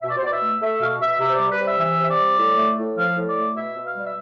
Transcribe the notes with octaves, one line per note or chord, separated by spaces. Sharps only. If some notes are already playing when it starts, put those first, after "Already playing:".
B2 E5
D5
C5
B2 D5
E5
A3
A3 E5
B2 F5
B2 E5
C3 E5
C5
D5
G3
B4
C3
E5
E3 E5
C3 E5
D5
G3
A2
A3
A2
F3 F5
A2
D5
A3
B2 E5
B2
F5
G3
E5